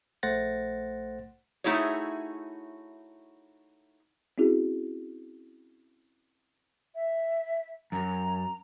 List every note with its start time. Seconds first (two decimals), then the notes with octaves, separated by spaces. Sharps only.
0.23 A#1 A3 C5 F#5 A6 A#6
1.64 A3 D#4 E4 F#4 G#4 C#5
4.38 C4 C#4 E4 F#4 G#4
6.95 E5
7.92 F#2 A#5